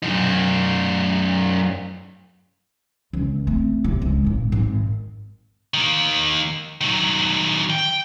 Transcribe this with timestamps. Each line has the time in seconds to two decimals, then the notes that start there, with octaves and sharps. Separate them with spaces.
0.02 F#2 D#4
3.13 C#2 E3
3.47 A3 C4
3.84 C3
4.02 C#2
4.24 G#1 A#2
4.52 G#1
5.74 D#3 A#3
6.81 D#3 F#3
7.70 G5